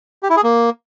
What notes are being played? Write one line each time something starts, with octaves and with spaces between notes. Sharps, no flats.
G4
E4
G#4
A#3